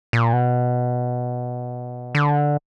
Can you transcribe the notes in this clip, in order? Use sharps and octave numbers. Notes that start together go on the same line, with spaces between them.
A#2
B2
D3